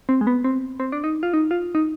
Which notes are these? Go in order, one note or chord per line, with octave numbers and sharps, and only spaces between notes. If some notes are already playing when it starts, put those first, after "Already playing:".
C4
G#3
B3
C4
C4
D4
D#4
F4
D#4
F4
D#4